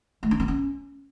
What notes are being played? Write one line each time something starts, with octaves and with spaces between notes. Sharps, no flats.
A3
D4
C4
C#4